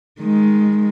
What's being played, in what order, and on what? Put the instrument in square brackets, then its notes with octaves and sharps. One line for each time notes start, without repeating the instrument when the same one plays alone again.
[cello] D#3 G#3